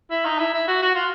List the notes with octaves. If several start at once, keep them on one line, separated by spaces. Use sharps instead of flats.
E4
D#4
E4
E4
F#4
F#4
F4